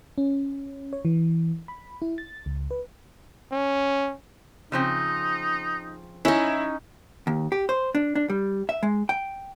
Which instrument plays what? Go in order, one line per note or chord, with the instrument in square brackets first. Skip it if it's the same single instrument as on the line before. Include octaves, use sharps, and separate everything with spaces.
[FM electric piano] C#4
C#5
E3
B5
E4
A6
C#2
B4
[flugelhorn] C#4
[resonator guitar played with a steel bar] C#3 F3 C4 [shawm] D#4
[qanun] C#4 D#4 [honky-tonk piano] E4
[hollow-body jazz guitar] D#2
G4
C5
D4
D4
G3
E5
G#3
G5